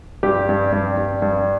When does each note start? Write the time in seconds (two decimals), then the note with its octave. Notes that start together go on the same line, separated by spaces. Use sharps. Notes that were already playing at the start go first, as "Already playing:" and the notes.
0.23 G2 G4
0.49 G2
0.72 G2
0.97 G2
1.22 G2